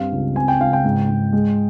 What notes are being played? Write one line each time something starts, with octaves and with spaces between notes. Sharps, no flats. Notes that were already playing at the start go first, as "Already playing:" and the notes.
Already playing: G2 C4 F5
C#2
C4 G#5
G5
C#2 F5
G5
G#2
G#2
G#3